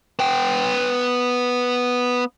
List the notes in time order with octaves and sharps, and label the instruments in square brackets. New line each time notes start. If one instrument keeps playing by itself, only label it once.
[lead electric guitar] B3 G5